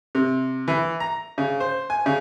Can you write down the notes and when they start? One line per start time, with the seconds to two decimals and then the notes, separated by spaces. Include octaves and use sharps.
0.15 C3
0.68 E3
1.00 A#5
1.38 C#3
1.60 C5
1.90 G#5
2.06 C#3